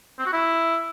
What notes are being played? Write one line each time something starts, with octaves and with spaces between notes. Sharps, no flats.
C4
F#4
E4